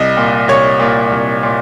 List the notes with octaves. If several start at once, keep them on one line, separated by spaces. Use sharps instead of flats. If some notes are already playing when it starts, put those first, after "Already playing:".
Already playing: C2 D#5
A#2
C2 C#5
A#2
C2
A#2